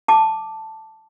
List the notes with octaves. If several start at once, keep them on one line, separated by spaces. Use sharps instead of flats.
A5 D6